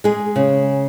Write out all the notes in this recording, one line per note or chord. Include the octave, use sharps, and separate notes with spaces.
G#3 G#4
C#3